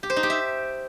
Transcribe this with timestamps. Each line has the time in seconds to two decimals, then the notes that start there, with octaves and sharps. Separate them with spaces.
0.03 G4
0.10 C5
0.16 D#4
0.23 G4
0.30 E5